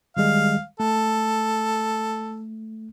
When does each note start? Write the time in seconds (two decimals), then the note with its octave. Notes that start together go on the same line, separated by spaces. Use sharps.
0.17 D#3 G3 G#3 F5
0.80 A3 A4